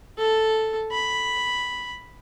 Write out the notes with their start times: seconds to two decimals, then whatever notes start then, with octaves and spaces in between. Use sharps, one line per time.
0.18 A4
0.92 B5